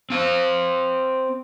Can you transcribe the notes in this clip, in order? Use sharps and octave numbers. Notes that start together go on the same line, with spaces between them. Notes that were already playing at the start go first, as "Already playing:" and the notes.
C4 F5